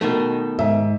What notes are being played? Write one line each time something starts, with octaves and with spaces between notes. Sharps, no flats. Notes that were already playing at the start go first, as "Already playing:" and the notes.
B2 D#3 A3
G#2 E5